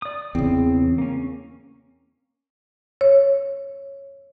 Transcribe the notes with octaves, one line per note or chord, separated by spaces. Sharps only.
D5 D#6
E2 C#3 C4
A#3 C#4
C#5